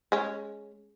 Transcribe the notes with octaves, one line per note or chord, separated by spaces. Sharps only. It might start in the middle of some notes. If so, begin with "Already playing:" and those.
G#3 C#4